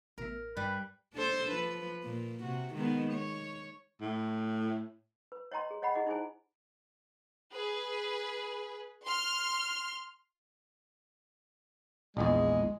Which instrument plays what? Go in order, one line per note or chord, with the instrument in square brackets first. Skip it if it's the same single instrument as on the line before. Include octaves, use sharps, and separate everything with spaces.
[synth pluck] A1 B2 E5 [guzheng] A#4
[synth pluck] G2 [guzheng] G3 [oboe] B4
[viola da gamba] D4 A4 C5
F3 B4
A#2 A#3
C3 F#4
D#3 G#3 B3
C#5
[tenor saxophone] A2
[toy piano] B4
C#5 D#5 G5 A#5 C6
G#4
C#5 D#5 F#5 G5 B5
E4 G#4 D#5 F#5
D#4 E4 G#4 C5 G#5
[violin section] G#4 B4
C6 F6
[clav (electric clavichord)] A#1 E2 [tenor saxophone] G#3